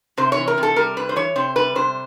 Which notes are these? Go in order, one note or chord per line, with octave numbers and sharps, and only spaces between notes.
C3 C5
C#5
E3
A#4
C3
A4
G3 A#4
C3 B4
C5
E3 C#5
C3 C5
G3 B4
C3 C5